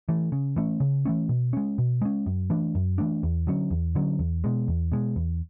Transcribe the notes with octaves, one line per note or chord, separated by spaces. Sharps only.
E3 A3
C#3
E3 A3 C#4
C#3
E3 A3 C#4
B2
G#3 C#4
B2
G#3 C#4
F#2
E3 A3 D4
F#2
E3 A3 D4
E2
D3 F#3 C#4
E2
D3 F#3 C#4
E2
B2 G#3
E2
B2 G#3
E2